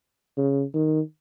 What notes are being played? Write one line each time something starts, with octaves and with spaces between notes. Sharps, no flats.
C#3
D#3